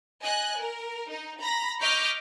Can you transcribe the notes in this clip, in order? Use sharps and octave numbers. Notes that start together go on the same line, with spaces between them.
D#5 G#5 F#6
A#4
D#4
A#5 B5 A#6
D#5 C#6 D6 F6 G6 B6